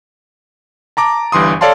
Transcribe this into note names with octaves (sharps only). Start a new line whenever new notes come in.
A5 A#5 D6
G1 G2 E3 C6 D#6
A4 C#5 D5 F5 A5 C6